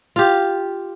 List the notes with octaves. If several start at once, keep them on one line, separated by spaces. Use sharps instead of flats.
F4 G4